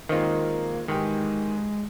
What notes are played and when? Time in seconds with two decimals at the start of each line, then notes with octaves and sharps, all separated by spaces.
0.09 D#3 G#3 A#3 C4 D#4 F4
0.88 E2 G#2 D#3 G#3 G4